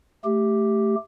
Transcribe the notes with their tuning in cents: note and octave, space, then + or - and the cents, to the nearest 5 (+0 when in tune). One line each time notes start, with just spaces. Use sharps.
A3 +0 G4 +0